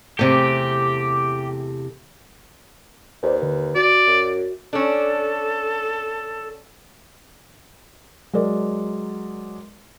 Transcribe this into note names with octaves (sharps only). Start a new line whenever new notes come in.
E2 C3 A3 G4
D#2 B4 C5 D5
D3 B4
F#4 D5
F#2
C#4 D4 A4
F#3 G#3 A#4 D5